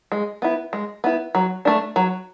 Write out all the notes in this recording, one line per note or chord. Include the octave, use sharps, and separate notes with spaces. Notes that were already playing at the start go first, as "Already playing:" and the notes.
G#3
B3 E4
G#3
B3 E4
F#3
A3 D4
F#3